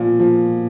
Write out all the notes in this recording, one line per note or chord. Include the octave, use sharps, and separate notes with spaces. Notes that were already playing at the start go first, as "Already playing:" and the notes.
Already playing: A#2 F3
F3